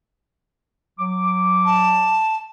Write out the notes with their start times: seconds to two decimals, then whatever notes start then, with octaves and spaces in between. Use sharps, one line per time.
0.99 F#3 D6
1.65 A5